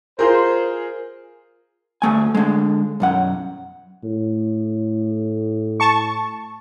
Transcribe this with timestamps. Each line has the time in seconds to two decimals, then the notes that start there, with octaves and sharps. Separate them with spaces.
0.19 F4 G#4 A#4 C5
2.02 D2 A3 G#5
2.35 D3 G#3
3.00 B1 F#2 F#5
4.04 A2
5.80 A5 C#6